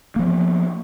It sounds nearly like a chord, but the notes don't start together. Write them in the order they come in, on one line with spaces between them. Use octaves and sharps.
A#3 F3 B3